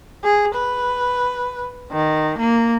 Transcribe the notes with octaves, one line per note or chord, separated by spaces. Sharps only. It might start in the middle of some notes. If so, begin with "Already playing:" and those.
G#4
B4
D#3
A#3